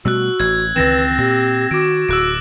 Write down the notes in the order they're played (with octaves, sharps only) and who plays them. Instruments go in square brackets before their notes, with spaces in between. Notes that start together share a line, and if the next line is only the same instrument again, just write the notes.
[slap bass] B2 G3 A3 [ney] F#4 [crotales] E6 F#6
[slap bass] A1 [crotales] G#6
[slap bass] C#2 D#3 E3 [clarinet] C4 [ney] B4 [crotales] A6 A#6 E7
[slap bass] A#2 [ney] G4
[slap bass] D#3 [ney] F#4 [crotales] D6 A#6 D7
[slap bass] D1 [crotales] E6 F#6 D7